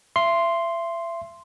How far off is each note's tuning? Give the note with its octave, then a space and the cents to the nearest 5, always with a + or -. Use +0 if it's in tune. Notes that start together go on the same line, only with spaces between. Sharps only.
E5 +35 C6 +0